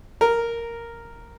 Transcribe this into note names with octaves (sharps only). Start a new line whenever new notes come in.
A#4